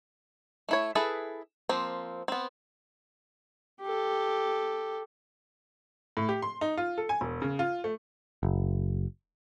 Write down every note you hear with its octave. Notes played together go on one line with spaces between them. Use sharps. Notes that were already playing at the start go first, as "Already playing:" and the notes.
A3 E4 C#5
E4 G#4 A4 B4 E5
F3 A#3 C4
B3 C4
G4 A4
A2
G4
C6
D#4
F4
A4
G#5
E1
C#3
F4
A3
F#1